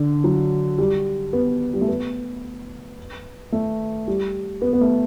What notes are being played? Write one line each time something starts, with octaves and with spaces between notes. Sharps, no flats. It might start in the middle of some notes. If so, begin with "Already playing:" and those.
Already playing: D3
F#3
G3
B3
G3
A3
B3
A3
G3
B3
B3
A3